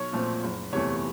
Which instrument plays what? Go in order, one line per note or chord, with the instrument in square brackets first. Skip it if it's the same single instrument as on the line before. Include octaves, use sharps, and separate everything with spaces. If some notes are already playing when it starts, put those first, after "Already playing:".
Already playing: [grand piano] B1 C#5
A#2 F3 A3 C4
F#1
E2 C3 E3 A3 C#5